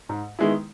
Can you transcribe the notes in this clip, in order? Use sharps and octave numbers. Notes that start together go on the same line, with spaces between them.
G#2
D#3 G#3 B3 E4